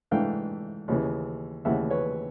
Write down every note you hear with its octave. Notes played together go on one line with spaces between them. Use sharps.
G#2 E3 A3 D4 F5 G5
D#2 C#3 E3
D#2 C#3 E3 E5 F#5
B4 C#5